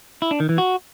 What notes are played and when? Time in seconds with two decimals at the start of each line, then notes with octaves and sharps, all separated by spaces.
0.22 E4
0.31 D4
0.40 D#3
0.49 E3
0.58 F#4